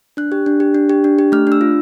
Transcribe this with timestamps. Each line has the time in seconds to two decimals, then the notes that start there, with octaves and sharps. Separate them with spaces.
0.17 D4 F#6
0.32 G4
0.46 D4
0.60 G4
0.75 D4
0.90 G4
1.04 D4
1.19 G4
1.32 A3 F6
1.47 D4 E6
1.61 F4